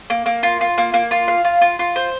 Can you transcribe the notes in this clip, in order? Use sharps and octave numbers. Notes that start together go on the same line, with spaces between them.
A#3
A#3
F4
F4
A#3
A#3
F4
F5
F4
F4
F4
C5